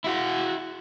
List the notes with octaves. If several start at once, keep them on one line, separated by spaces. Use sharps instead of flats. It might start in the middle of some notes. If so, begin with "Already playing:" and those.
E4 F#4